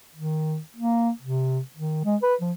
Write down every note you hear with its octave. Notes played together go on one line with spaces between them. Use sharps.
D#3
A#3
C3
D#3
G#3
B4
F3